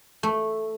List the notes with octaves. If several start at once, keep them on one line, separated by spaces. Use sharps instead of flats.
A3